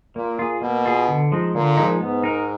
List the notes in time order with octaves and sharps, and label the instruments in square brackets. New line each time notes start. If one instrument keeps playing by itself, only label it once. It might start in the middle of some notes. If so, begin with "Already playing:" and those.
[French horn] A#2 [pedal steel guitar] A#3
[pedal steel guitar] F4 G#4
[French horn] B2 [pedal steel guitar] A#3
[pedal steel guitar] F4 G#4
D3
F3 G#3 D#4
[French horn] A#2 [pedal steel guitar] D3
[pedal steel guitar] F3 G#3 D#4
[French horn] G#2 [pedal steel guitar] B3
[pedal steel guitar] D#4 A#4